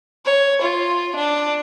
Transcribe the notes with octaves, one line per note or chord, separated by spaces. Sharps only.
C#5
F4
D4